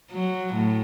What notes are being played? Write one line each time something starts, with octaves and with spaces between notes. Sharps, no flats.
F#3
A2